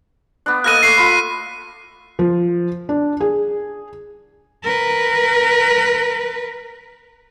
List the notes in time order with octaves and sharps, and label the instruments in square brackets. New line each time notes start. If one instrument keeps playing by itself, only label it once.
[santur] B3 D4
[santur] A#3 A4 D#5 [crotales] F#6 A#6 D#7
[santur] A3 D6 [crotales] C7
[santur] F4 B5
[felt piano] F3
D4
G#4
[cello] A#4 B4